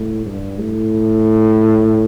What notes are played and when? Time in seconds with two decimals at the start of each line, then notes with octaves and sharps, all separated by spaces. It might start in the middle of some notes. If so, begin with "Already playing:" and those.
Already playing: A2
0.26 G2
0.59 A2